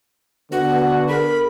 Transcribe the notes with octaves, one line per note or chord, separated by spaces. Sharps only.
D3 B3 F#4
G#4 A#4 B5